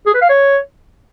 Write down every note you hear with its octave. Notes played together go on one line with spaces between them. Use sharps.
G#4
B4
F5
C#5